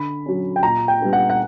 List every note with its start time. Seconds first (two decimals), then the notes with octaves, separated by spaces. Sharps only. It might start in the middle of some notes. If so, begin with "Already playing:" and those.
Already playing: D3 B5
0.26 F#3 C#4
0.56 G5
0.63 A#2 A#5
0.88 G5
1.00 G3 B3 D4
1.13 F#5
1.30 F#5